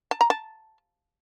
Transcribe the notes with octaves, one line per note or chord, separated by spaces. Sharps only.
A5
A#5
A5